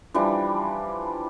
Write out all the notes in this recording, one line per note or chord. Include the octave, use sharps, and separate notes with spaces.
E3 F3 G3 D4